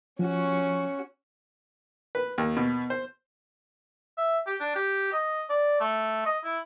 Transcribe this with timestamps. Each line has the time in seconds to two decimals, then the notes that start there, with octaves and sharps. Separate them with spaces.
0.19 F3 C#4 F#4
2.15 B4
2.38 D#2
2.57 B2
2.90 C5
4.18 E5
4.47 G4
4.60 D4
4.76 G4
5.13 D#5
5.50 D5
5.81 A3
6.26 D#5
6.44 E4